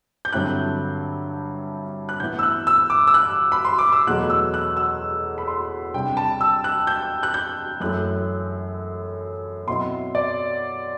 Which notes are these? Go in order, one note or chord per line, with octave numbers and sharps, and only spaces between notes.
G6
G2 D3 F#3 C4 E4 F#6
F#6
A2 E3 B3 E4 G6
E6
F#6
E6
D6
E6
F#6
B5
C6
D6
E6
E2 B2 F#3 A3 F#6
E6
F#6
E6
B5
C6
C3 G3 D4 G5
A5
E6
F#6
G6
F#6
G6
F#2 E3 A3 F#6
B2 F#3 C4 E4 C6
D5